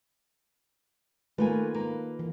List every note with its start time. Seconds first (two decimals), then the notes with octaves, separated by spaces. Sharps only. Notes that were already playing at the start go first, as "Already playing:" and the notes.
1.38 D#3 A3 A#3 F4 B4 G#5
1.74 A#3
2.19 E3